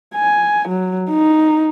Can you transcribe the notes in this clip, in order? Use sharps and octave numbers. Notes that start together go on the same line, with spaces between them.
G#5
F#3
D#4